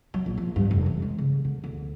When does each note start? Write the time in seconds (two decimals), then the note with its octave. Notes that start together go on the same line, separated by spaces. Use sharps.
0.14 F#3
0.26 A#1
0.38 F3
0.56 G2
0.71 F1
0.86 E3
1.02 G#3
1.18 C#3
1.45 D3
1.64 D2